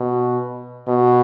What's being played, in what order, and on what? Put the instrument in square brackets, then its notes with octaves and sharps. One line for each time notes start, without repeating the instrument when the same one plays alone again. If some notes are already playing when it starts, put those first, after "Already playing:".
Already playing: [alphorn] B2
B2